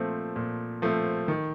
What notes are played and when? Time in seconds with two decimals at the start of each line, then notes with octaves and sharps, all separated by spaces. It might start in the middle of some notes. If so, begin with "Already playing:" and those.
Already playing: A#2 F3 A3 C4
0.36 A#2
0.82 F3 A3 C4
1.28 D#3